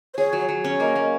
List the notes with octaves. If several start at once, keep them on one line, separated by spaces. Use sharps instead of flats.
C5
G#4 C#5
F#3
F#3
C#4
A#3 D#5
A#3